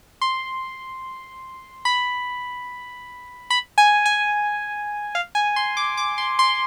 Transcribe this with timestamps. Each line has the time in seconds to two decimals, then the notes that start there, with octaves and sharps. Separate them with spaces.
0.21 C6
1.85 B5
3.50 B5
3.78 G#5
4.06 G#5
5.15 F5
5.35 G#5
5.56 C6
5.77 D6
5.97 D6
6.18 C6
6.39 C6